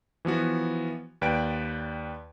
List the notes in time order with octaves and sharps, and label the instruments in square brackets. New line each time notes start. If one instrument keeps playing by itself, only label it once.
[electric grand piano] E3 F3 B3 F#4
D#2 B4 D5 G5 D7